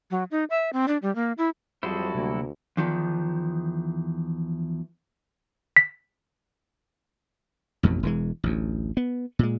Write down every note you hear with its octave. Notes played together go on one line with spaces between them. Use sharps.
F#3
D#4
E5
C4
D4
G3
A#3
E4
F2 F#3 G3 E4 F#4 G#4 A4 C5
D2 C3 A#3
E2 D#3 F3
B6
A1 F2 B2
E1 E3 G#3
A1 D2
B3
A#2 G#3